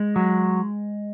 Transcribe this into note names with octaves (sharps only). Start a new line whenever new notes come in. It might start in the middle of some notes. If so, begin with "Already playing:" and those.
Already playing: G#3
F#3